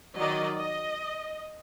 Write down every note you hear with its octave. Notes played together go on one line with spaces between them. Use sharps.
D#3 F#3 D5 D#5
D#5